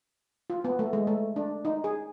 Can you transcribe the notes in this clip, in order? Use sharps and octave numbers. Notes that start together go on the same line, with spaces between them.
F4
B3
A3
G#3
A3
D4
D#4
G#4